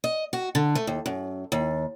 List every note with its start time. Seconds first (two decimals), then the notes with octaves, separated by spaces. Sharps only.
0.04 D#5
0.33 F#4
0.55 D3
0.75 A3
0.87 D#2
1.06 F#2
1.52 D#2